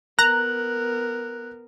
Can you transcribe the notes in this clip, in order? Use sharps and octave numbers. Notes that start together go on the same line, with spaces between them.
B3 A#4 A#5 F#6